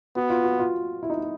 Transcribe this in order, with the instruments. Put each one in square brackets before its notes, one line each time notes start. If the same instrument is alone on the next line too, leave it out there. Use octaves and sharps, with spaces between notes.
[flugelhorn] B3 [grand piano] F#4
[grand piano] F4
F#4
F4
E4
D#4
E4